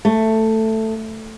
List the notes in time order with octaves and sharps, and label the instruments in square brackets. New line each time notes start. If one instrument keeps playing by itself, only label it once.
[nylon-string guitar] A3